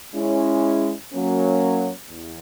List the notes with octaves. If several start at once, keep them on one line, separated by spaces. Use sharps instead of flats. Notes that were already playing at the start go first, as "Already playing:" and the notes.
G#3 C#4 E4
F#3 A#3 C#4
E2